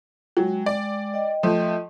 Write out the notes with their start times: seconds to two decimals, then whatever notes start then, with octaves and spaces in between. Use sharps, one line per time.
0.37 F#3 G#3 G5
0.66 D5
1.14 D#5 G5
1.43 F3 A3